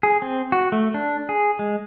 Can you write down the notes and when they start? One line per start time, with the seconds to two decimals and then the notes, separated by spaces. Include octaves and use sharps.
0.03 G#4
0.22 C4
0.52 F#4
0.72 A3
0.94 D4
1.29 G#4
1.59 G#3